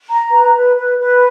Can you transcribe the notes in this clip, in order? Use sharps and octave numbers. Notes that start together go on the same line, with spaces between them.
A#5
B4
B4
B4
B4